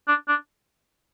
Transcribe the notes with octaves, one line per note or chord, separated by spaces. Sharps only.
D4
D4